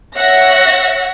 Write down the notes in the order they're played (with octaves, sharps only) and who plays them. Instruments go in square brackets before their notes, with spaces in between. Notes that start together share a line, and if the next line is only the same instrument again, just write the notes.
[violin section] C#5 E5 F#5 A#6